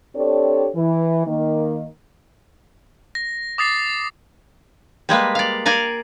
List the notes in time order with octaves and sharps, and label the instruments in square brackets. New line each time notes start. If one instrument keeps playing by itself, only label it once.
[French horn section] C4 D4 G4 A4 C#5 D5
E3
D#3 A#3
[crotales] A#6
D6 D#6 A6 C7
[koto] G3 G#3 A#3 B4
D5 F5
A#4 D5 F5 G#5